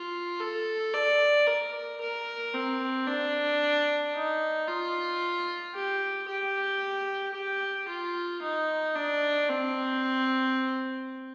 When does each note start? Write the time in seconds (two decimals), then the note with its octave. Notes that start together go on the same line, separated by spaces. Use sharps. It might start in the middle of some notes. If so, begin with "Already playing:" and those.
Already playing: F4
0.40 A4
0.94 D5
1.47 A#4
2.01 A#4
2.54 C4
3.07 D4
4.15 D#4
4.68 F4
5.75 G4
6.28 G4
7.35 G4
7.88 F4
8.42 D#4
8.95 D4
9.49 C4